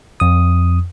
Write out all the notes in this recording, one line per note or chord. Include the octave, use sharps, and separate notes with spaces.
F2 D#6